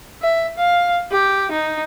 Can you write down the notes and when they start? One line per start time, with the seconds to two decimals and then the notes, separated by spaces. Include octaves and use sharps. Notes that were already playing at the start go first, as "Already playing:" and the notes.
0.22 E5
0.58 F5
1.11 G4
1.51 D#4